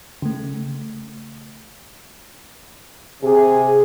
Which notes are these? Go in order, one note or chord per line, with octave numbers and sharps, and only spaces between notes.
C#3 A3
C3 G#4